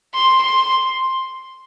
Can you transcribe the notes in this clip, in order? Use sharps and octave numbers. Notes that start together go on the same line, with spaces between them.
C6
C6